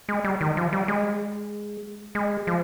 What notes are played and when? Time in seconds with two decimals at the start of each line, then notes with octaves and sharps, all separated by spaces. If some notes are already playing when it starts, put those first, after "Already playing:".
0.09 G#3
0.24 G3
0.41 D#3
0.57 F3
0.73 G3
0.88 G#3
2.15 G#3
2.47 F3